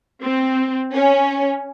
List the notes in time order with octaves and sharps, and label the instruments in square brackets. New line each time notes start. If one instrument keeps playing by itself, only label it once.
[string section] C4
C#4